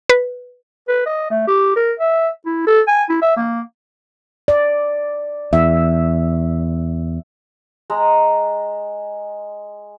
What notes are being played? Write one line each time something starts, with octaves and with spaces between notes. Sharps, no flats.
B4
B4
D#5
A3
G4
A#4
E5
E4
A4
G#5
E4
E5
A#3
D5
E2 E5
G#3 A#5